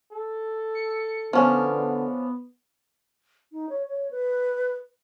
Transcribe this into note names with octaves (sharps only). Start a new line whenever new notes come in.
A4
C#7
D3 F3 B3 C#4 D4
D#4
C#5
C#5
B4